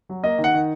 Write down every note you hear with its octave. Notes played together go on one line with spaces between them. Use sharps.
F#3
A#3 D#5
D#3
F#5
D#3